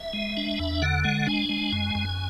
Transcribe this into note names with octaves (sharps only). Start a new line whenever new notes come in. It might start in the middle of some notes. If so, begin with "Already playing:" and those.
Already playing: E5
G#3
D4
E2
D3 F#5
G#3 F#5
D4 G#5
G#3
F#2
F#2